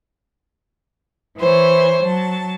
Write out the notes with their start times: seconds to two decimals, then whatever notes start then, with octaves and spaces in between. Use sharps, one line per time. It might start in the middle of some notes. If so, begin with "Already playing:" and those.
1.38 E3 C5 C#5
2.02 F#3 A5